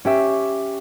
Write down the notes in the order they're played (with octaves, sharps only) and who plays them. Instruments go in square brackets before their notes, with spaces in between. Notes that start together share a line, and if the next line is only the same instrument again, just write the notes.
[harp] C#4 G4 E5